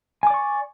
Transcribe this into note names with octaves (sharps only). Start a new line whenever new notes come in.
D5 G#5 C#6 D6